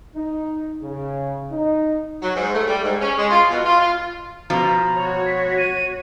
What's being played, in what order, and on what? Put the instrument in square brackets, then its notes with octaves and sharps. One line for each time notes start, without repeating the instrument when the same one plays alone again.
[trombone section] D#4
C#3
D#4
[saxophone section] F#3
G#2
A3
G3
G#2
C#4
G#3
F4
B2
F4
F4
[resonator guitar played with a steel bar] B2 F3 [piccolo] A#5
[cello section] F#4 C#5
[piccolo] B6
D#7